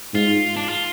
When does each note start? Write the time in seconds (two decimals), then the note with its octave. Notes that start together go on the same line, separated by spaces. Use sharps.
0.14 G#2 F4
0.56 D4
0.69 F4